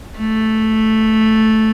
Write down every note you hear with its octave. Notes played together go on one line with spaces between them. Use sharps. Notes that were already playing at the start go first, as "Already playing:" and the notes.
A3